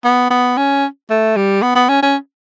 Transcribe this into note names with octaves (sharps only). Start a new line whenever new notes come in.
B3
B3
C#4
A3
G3
B3
B3
C#4
C#4